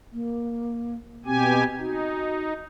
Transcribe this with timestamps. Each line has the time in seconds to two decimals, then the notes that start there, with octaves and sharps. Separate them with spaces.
0.13 A#3
1.26 B2 C4 G4 G#5
1.78 D#4 F#4